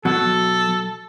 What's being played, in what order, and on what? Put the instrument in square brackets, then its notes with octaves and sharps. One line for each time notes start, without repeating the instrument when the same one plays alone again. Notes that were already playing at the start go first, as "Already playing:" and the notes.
[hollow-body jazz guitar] B2 F#3 [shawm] A4